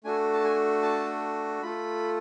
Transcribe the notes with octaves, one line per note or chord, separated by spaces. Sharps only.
A3 D4 F#4 A4 G#5
A5
G#5
A5
A3 F4 A4 B5